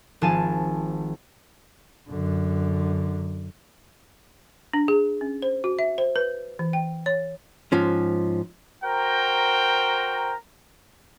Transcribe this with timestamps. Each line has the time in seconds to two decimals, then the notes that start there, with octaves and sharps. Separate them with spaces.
0.21 G#1 F3 F4 G#5 A5
2.10 F#2 D3
4.73 D4
4.88 G#4
5.21 C#4
5.42 C5
5.64 F#4
5.79 E5
5.98 C5
6.16 B4
6.59 E3
6.73 G5
7.06 C#5
7.72 G#2 F3 C#4
8.84 F#4 A#4 C5 G5 A#5